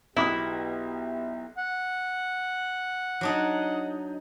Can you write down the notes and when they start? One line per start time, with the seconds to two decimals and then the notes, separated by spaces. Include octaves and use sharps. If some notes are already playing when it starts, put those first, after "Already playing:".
0.17 B1 B2 B3 E4 G4 E5 D6 D#6
1.58 F#5
3.21 F#3 D4 D#4